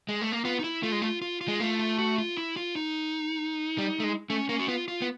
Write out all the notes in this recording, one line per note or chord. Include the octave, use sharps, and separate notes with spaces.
G#3
A3
A#3
B3 F4
D#4
E4
A3 F4
G#3
A3 F4
F4
F4
G#3
A3 F4
F4
F#4
F4
E4
F4
D#4
G3
A3
G#3
A3 C#4
A#3 C#4
F#4
B3 F4
F4
B3